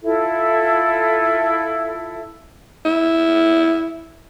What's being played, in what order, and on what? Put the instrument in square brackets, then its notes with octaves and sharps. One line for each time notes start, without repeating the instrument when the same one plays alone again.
[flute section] E4 F4 A4
[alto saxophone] E4